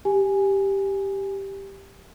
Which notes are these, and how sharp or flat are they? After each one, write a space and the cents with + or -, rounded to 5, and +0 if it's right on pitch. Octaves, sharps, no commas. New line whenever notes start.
G4 +0 G#5 +0